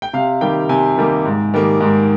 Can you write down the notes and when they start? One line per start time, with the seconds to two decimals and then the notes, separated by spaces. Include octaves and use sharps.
0.02 G5
0.13 C3 F5
0.41 D#3 G3 A#3 G5
0.69 C3 G#5
0.97 D#3 G3 A#3
1.25 G#2
1.54 D#3 G3 A#3
1.81 G#2